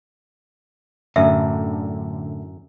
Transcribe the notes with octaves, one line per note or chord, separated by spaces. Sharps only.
F#2 A2 D3 E5